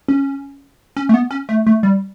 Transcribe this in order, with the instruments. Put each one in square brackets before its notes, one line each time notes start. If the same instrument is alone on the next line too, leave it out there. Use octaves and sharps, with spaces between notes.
[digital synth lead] C#4
C#4
A3
B3
C#4
A3
A3
G3